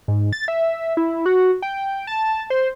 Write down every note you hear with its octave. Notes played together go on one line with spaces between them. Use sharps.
G#2
A6
E5
E4
F#4
G5
A5
C5